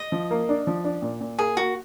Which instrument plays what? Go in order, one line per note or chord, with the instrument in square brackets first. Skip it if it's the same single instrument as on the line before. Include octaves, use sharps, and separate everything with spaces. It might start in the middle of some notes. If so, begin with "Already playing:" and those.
Already playing: [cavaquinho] D#5
[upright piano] F3
A#3
D4
F3
D4
A#2
A#2
[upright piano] A#3 [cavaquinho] G#4
[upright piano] A#3 [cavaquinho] F#4